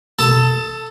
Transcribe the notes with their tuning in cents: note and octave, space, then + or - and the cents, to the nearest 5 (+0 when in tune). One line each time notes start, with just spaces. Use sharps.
A4 +0 A5 +25 D#6 +35